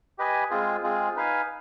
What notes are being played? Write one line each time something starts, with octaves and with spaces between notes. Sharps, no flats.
G4 B4 D#5 G#5
G#3 C4 F4 G#4
G#3 C4 F4 G#4
D#4 B4 F5 G#5